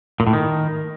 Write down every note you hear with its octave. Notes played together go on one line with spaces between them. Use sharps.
A#2
A2
D#3